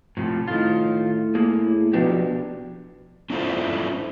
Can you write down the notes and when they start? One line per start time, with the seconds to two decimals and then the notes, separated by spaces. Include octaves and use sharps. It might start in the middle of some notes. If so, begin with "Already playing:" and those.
0.17 A2 C3 F3
0.48 A2 D#3 F4
1.35 A#3 G#4
1.93 B2 F3 D4 G4
3.30 C#4 D4 E4 F4 A4 C5